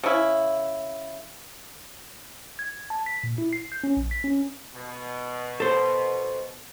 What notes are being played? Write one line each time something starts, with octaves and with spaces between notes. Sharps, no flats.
C#3 E4
G#6
A5
B6
A#2
E4
C7
G6
C#4
A#1
B6
C#4
B2
A4 C5